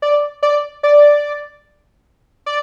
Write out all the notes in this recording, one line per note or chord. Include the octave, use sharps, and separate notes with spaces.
D5
D5
D5
D5